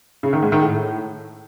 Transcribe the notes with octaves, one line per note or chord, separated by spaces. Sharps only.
C#3
D#3
G#2
D#3
A2